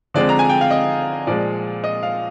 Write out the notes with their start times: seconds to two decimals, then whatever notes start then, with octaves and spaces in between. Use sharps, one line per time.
0.14 D3 F3 G#3 C4 D5
0.29 A#5
0.39 G#5
0.49 G5
0.61 F5
0.71 D#5
1.27 A#2 F3 G#3 D5
1.84 D#5
2.03 F5